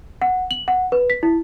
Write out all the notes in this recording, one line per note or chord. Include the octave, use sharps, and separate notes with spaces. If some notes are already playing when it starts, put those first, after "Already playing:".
F#5
F#7
F#5
B4
B6
E4